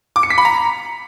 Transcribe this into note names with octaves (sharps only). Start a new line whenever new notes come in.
D6
C#7
B6
B5
A#5